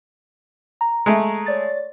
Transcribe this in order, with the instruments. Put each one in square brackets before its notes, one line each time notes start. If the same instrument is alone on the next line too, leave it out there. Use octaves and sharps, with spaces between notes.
[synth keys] A#5
[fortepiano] G#3 A3
[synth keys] C#5 D5 A6